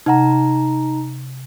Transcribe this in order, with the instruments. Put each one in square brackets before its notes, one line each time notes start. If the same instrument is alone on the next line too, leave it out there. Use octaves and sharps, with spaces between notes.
[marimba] C3 F#5 [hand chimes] D#4 A#5